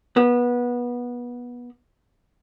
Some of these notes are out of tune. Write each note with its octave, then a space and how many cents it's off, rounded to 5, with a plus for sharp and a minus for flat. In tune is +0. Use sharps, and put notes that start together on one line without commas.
B3 -20